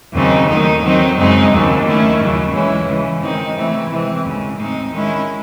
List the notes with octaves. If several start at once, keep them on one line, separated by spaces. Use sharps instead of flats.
D#2 C#3 F#3 C4 D#4
D#3 F#3 A3 D#4
D#3 F#3 C4 D#4
F#2 C#3 G#3 C4 D#4
D#2 C#3 F#3 C4
D#3 A3 C#4 E4
D#2 C#3 F#3
C#3 E3 G#3 C#4 E4
C#3 E3 G#3
D#3 G#3 C4 D#4
C#3 E3 A3 C4 E4
C3 E3 G#3 C4
D#2 C#3 G#3
A2 G#3 C4 D#4
D#3 G#3 C#4 E4